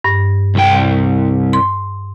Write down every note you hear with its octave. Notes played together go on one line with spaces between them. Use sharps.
G2
C2 G5
C6